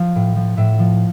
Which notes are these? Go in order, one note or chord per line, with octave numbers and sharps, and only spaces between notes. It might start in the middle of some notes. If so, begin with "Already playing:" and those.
Already playing: F3 F5
A2
F3
A2 E5
F3